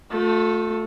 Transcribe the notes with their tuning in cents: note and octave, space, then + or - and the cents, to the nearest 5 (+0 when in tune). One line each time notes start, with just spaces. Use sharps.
A3 +0 F4 +45